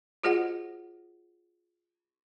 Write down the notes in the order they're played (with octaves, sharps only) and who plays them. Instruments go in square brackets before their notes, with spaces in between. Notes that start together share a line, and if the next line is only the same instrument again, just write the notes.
[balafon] F4 F#4 G#4 C5 D#5 F#5